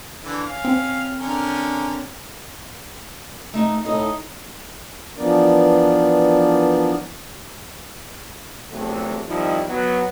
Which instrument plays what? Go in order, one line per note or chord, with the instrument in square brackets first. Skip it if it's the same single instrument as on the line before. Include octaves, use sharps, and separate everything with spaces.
[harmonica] D3 E3
C#4 F5
[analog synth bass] C4
[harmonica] D3 C#4 A#4
[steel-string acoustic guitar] A3 D#4
[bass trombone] A2 [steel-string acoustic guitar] D#4 D#5
[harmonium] E3 F3 B3 D4 A#4 D5
[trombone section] A#1 E2 C3 F#3 A3
D#3 F3 G3 C4 D#4 E4
F#3 B3